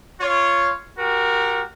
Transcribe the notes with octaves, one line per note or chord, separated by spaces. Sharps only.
F4 C#5
F#4 G4 A#4